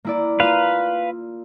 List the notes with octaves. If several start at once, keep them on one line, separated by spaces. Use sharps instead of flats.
A#3 E4 D5
A#3 F4 B4 F5 D#7